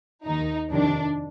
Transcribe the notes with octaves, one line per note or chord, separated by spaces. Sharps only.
D#2 D#3 D#4
F2 C3 D#3 D4